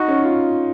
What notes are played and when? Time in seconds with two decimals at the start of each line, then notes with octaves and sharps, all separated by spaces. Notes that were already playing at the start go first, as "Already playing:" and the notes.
Already playing: D#4 F#4
0.08 C#4
0.24 F4